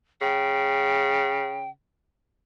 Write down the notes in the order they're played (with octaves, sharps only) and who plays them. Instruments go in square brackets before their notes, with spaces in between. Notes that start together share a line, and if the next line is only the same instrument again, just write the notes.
[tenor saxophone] C#3 [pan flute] G5